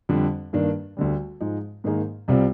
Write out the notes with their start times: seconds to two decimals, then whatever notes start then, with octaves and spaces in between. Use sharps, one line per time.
0.09 F2 D3 G3 D4
0.53 G2 D#3 A#3 D4
0.97 D2 D3 G3
1.41 G#2 F3 G#3 D#4
1.84 G#2 D#3 A#3 D#4 G#4
2.28 C2 C3 G3 C4 F4